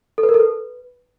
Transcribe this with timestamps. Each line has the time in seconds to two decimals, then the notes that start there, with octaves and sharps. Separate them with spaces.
0.18 A4
0.23 B4
0.29 A#4
0.34 A4
0.40 B4